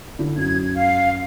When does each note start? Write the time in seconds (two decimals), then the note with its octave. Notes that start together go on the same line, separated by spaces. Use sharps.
0.19 D3 E4
0.37 F#2 G#6
0.75 F5